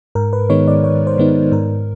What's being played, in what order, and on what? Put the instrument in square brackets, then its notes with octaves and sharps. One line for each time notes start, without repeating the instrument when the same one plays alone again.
[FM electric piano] G#2 A#4
B4
D#3 G#3 B3 D#4 C#5
D5
G#2 C#5
C5
D#3 G#3 B3 D#4
G#2 A#4